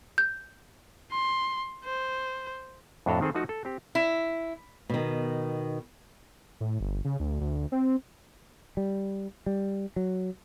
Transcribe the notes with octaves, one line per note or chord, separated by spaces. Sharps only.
G6
C6
C5
F2 A2 D4 F#4 A4 A#5
D#3 C4 G#4 A4
F3 A3 D#4 F#4
A4
C4 G4
E4
B2 D#3
A2
G1
C#3
D2
D2
C4
G3
G3
F#3